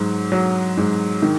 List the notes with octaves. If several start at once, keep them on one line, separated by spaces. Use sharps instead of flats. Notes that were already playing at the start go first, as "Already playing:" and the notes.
Already playing: G#2 F#3
F#3
G#2
D#3